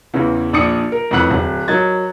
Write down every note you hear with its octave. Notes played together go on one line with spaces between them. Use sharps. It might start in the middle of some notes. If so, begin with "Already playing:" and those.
E2 C#3 E3
A#1 D4 D6 D#6 C#7
A#4
F2 A2 E3 F#5 B5 F#6
D1
F#3 A#4 D#5 G#6 A6